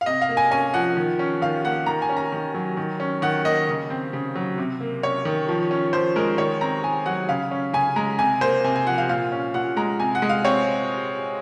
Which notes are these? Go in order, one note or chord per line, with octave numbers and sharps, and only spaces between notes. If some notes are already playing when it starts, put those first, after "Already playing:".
F5
C3 D#5
F5
A#3
G#5
C#4 G#5
F3 F#5
D#3
C#4
D#3 F5
A#3 F#5
D#3 A#5
G#5
C#4
A#5
D#3
F#3
D#3
C#4
D#3 F#5
A#3 D#5
C#3
C4
C#3
F#3
C3
A#3
C#4 C#5
D#3
F3
C#4
F3 C5
G#3 A#4
D#3 C#5
C4 A#5
D#3 G#5
F#3 F#5
C#3 F5
C#4
C#3 G#5
G#3 A#5
C3 G#5
A#3 C5
C3 G#5
G#5
F3 F#5
F5
A#2 F5
C#4
A#2 F#5
G#3 A#5
C3 G#5
F#5
G#3
F5
C4 C#5